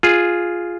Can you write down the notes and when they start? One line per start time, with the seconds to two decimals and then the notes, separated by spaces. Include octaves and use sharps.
0.03 F4 G#4